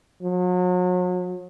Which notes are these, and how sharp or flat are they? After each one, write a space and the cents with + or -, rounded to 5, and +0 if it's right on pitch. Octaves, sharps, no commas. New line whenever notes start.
F#3 -40